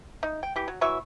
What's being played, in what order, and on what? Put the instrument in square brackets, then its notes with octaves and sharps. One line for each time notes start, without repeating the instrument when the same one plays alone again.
[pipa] D#4
G5
E3 G4
F#3
E3 F#3 E5 C#6